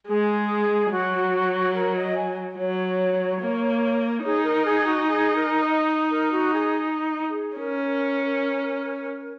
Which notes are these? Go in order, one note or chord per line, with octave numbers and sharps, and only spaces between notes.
G#3 G#4
F#3 F#4
A#4
D#5
G#5
F#3 C#5
A#3
D#4 G#4
A#4
G#4
F#4
G#4
A#4
D#5
A#4
F#4
G#4
G#4
C#4 A#4